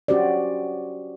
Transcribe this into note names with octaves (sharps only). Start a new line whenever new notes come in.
C#4 F#4 G4 C5 D5